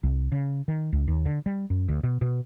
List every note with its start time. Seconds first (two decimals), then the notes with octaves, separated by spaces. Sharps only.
0.03 C2
0.32 C#3
0.68 D#3
0.93 C#2
1.08 D#2
1.26 D3
1.46 G3
1.70 F#2
1.89 D2
2.03 B2
2.21 B2